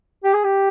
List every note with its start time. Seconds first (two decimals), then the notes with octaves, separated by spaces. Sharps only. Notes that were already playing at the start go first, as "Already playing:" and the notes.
0.24 G4
0.34 G#4
0.44 G4